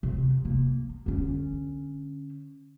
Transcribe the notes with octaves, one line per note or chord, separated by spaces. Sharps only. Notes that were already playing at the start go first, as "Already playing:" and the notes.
C3
A#3
D3 C#4